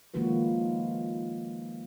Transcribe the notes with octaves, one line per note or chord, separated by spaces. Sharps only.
D#3 F3 G#3 A#3 F#4 B4